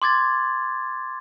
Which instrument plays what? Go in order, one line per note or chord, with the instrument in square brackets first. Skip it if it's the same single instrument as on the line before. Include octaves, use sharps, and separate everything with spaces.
[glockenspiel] C6 D6 G#6 A6